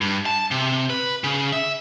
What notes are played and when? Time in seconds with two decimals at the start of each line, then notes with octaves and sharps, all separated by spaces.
0.01 G2
0.26 A5
0.51 C3
0.90 B4
1.24 C#3
1.53 E5